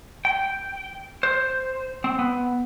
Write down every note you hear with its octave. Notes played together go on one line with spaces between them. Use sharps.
G5
C5
C4
B3